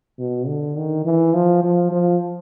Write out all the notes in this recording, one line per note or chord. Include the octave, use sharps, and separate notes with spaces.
B2
D3
D#3
E3
F3
F3
F3